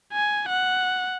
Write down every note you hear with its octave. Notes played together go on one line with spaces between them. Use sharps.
G#5
F#5